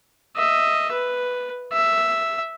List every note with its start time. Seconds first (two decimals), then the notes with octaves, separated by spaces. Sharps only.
0.36 D#5 E5
0.92 B4
1.73 E5